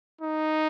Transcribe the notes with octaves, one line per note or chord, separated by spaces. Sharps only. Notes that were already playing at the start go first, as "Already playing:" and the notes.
D#4